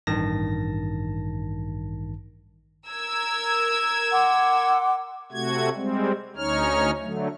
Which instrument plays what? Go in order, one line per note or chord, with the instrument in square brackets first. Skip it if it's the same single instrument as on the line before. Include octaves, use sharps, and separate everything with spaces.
[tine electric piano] A1 G2 D#3 A5 A#6
[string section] A#4 E6 G#6
[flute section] F#5 C6 D6
[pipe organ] C3 A3 F#4 G#6
G3 G#3 C4
D2 C#4 D#4 C#5 F6
D3 F#3 A3